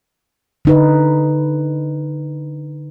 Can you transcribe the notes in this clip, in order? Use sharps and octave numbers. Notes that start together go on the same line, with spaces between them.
D3 D#4 B4